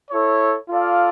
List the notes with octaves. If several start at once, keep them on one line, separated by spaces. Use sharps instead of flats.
E4 A4 C#5
F4 A4 D5 F5